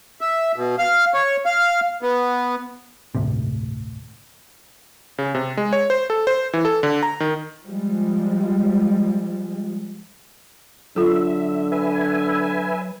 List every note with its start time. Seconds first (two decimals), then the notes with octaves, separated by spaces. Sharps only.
0.21 E5
0.56 B2
0.78 F5
1.14 C#5
1.46 F5
2.02 B3
3.15 G1 D2 A2 C3
5.18 C#3
5.35 C3
5.57 G#3
5.73 C#5
5.90 C5
6.10 A4
6.27 C5
6.53 E3
6.65 A4
6.83 D3
7.03 A#5
7.20 D#3
7.63 F3 G3 G#3
10.96 D3 F#3 F4 A4 E5
11.72 B4 E5 G#5